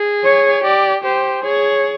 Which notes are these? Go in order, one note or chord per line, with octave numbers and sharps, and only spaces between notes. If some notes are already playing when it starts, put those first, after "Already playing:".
Already playing: G#4
C#5
G4 D5
G4 C5
G#4 C#5